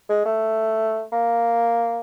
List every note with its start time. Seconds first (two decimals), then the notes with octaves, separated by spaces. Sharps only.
0.09 G#3
0.26 A3
1.12 A#3